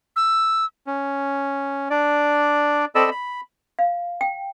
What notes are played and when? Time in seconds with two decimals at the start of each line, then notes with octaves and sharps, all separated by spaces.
0.16 E6
0.87 C#4
1.90 D4 D5
2.95 C4 A4 D5 D#5 B5 E6
3.11 B5
3.79 F5
4.21 G5